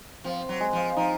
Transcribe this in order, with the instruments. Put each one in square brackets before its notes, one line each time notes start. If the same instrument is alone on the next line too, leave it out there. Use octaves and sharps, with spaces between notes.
[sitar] F3 [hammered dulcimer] C4
[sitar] F#3
[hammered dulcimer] G#3
[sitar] F3
[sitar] F3 [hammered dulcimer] D#4